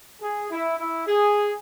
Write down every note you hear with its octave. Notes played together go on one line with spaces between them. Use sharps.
G#4
E4
E4
G#4